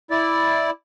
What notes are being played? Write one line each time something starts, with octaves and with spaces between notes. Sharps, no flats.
E4 D5